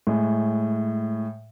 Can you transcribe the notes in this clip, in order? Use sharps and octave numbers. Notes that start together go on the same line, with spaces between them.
A2 G#3